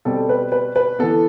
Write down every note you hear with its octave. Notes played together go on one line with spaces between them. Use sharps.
B2 G3 C4 A4
B4
B4
B4
E3 B3 A4